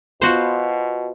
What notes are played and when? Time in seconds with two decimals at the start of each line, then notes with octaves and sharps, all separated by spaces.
0.21 B2 B3 F4 F#4 C5